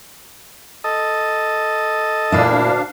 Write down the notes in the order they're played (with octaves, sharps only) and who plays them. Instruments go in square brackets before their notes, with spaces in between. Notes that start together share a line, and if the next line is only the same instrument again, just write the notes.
[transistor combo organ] A4 D#5
[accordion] D2 D4 F5 [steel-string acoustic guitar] A#2 A#3 E4